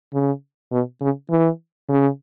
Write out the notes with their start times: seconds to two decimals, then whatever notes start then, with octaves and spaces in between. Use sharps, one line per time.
0.13 C#3
0.72 B2
1.01 C#3
1.30 E3
1.89 C#3